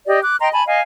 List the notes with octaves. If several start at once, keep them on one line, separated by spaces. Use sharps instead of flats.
G4 D5 D#5
D6 F#6
D#5 G5 A#5 C6
G#5 A5 B5
D#5 F5 G#5